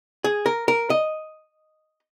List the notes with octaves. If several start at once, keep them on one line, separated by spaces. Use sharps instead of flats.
G#4
A#4
A#4
D#5